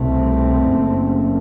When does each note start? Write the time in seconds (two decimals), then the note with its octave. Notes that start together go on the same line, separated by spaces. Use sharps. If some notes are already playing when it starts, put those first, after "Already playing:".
Already playing: C2 B2 A3 C4
0.69 F#1 F#2